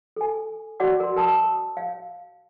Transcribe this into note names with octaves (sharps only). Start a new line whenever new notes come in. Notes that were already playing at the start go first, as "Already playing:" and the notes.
A4 G#5
F#4 D5 F#5 D6
A#4 C6
A#4 A5 D#6 E6
F5